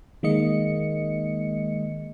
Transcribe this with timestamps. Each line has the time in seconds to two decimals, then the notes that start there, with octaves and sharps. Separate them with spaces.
0.23 D#3 G#3 A#3 D#5 C#7